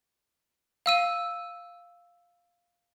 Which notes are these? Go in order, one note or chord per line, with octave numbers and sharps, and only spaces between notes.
F5 E6 D#7